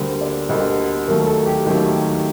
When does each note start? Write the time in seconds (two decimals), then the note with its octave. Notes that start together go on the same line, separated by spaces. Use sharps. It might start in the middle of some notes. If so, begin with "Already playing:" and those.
Already playing: D2 D3 G3 A#3 C5
0.21 D5
0.49 D2 D3 G3 A#3 D#5
1.08 D#2 D#3 F#3 A3 A#4
1.27 A4
1.46 G4
1.66 D#2 D#3 F#3 A3